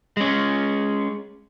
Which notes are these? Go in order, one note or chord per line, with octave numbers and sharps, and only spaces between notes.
G#3 C#4